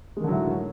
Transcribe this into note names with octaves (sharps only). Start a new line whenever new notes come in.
A2 D3 D#3 F#3 G#3